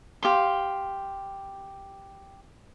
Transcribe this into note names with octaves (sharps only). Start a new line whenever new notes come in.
G4 F5 C6